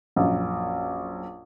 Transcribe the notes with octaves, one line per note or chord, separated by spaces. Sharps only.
A#1 F#2